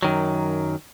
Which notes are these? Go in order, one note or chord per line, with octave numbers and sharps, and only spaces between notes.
F#2 D#3 F#3